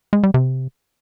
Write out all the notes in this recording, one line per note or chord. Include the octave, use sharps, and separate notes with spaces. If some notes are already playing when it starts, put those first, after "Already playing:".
G#3
G3
C3